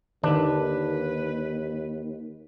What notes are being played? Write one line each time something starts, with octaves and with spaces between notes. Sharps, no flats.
D#2 D3 D#3 D4 B4